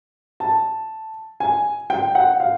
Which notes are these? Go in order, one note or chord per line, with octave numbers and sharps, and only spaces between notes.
A5
G#5
G5
F#5
F5